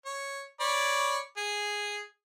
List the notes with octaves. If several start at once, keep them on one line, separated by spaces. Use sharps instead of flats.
C#5
C#5 D5 B5
G#4